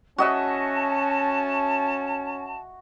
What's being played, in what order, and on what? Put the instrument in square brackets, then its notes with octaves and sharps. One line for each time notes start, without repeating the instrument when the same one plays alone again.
[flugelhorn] C#4 [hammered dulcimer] F#4 D#5 E5 [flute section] A5